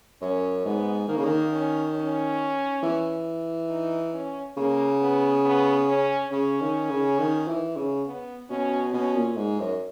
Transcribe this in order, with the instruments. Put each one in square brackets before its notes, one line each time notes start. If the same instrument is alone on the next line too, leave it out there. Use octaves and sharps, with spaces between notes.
[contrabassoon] F#2 [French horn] C#4
[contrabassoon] G#2 [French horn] B3
[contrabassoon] D#3 [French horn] A#3
[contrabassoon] C#3
D#3
[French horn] C#4
C#4
[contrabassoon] E3
[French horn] D#4
C#4
[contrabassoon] C#3 [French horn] A#3
[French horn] B3
B3
C#4
[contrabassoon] C#3 [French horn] C#4
[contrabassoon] D#3
C#3
D#3
E3
C#3
[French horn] B3
[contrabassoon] B2 [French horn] C#4
[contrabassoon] B2 [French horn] C#4
[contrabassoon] A#2
G#2
F#2